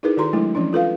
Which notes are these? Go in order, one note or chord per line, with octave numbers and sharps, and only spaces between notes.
D#4 E4 G#4 A#4 B4
D#3 F#4 A4 A#5 C6
F#3 G#3 A3 D4 E4
E3 F3 C#4 D4
F4 A4 B4 F5